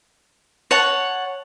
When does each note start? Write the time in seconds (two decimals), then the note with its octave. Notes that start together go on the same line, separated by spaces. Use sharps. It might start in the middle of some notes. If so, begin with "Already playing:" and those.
0.71 C#5 F#5 A5